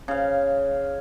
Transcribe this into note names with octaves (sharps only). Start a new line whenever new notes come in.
C#3 F5